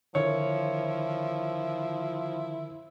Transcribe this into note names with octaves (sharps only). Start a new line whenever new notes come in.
D3 D#3 F3 E4 A#4 C#5